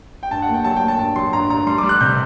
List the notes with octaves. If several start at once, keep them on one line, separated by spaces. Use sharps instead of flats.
G5
G2 A5
F#5
A#3
G5
F#3 A5
G5
A#3
A5
G2 A5
F#3 C6
G2 A#5
G2 A#5
G3 C6
G3 D6
F#6
C3 G6